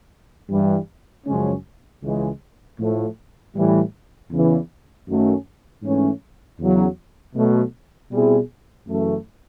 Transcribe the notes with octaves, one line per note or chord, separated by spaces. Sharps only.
G2 E3 G3
F#2 C#3 F3 G#3 C#4
C#2 C#3 E3 G#3
A2 F3 A3
A2 E3 G3
E2 C#3 E3
F#2 D#3 F#3 A3 C#4
G#2 E3 A3 C#4
E2 C#3 F#3
B2 F#3 A3
B2 G3 C4 E4 G#4
F#2 C#3 E3 A3